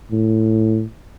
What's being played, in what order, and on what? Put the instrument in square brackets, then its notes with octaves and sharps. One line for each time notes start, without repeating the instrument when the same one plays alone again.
[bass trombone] A2